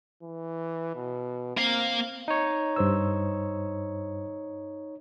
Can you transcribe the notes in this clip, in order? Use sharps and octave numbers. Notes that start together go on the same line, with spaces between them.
E3
B2
A#3 C4 F5
D#4 C#5
G2 C5 E6